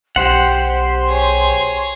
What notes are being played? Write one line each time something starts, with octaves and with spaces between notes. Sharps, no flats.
B1 G4 C5 F#5 C6
G#4 C#5